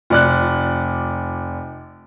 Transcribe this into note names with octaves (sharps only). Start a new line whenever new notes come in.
F1 D5 F#6